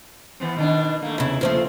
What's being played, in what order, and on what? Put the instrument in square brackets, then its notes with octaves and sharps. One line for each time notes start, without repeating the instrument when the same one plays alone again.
[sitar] E3 B3 C4
B2 D#3 D4
A3 A#3
[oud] E2 C#3 [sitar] E4
[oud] D#2 F3 A3 [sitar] C4